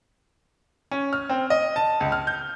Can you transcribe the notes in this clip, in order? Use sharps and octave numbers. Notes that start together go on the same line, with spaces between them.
C#4
F6
C4
D#5
A5
C#2
F6
G6